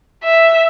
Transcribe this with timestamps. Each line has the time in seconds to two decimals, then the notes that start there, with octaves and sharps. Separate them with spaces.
0.24 E5